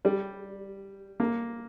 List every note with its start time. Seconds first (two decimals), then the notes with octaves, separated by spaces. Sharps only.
0.05 G3
1.20 A#3